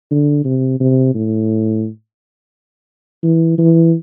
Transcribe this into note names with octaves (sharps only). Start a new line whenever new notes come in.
D3
C3
C3
A2
E3
E3